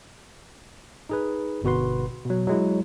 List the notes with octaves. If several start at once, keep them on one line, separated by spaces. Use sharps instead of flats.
D#4 G#4 B4
G1 B2 F#4 B4 C6
B2 F#3
F#3 G#3 E4